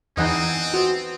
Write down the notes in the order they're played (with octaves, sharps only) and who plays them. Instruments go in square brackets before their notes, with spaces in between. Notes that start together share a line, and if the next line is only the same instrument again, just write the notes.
[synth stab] E2 E3 D#4 [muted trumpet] C4 [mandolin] D#5 F#5 G#5
[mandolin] B3 C5 [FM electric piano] F#4